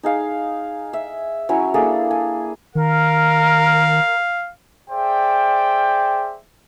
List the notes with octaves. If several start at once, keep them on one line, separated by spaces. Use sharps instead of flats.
D#4 G#4 F5
E5
F#3 C#4 E4
A#3 D4 G#4 A4
G#5
D#3 A#4 F5
G#4 C5 D5 E5 G5